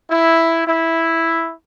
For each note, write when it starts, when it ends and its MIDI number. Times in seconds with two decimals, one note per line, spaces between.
0.11 0.66 64
0.67 1.53 64